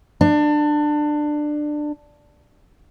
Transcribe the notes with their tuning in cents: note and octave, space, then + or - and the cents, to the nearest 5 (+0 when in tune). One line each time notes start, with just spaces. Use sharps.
D4 +20